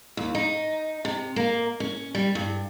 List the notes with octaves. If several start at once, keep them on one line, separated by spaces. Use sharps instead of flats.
D#2
D#4
C3
A#3
C#4
G3
G2